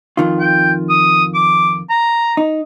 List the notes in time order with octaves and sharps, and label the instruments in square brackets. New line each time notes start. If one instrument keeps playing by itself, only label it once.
[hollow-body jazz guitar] F2 D#3 F4
[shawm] G5
D#6
D6
A#5
[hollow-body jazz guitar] D#4